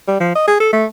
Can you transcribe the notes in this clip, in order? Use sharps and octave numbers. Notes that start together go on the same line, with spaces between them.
G3
F3
D#5
G#4
A4
A3